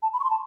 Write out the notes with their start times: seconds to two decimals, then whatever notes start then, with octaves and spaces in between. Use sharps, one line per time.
0.02 A5
0.13 B5
0.20 C#6
0.24 C6
0.30 A5